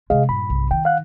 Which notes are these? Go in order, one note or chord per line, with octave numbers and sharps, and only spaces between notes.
C3 G#3 G#4 D#5 F5
G2 A#2 B5
B1 C3
D#3 G5
F5 F#5 F#6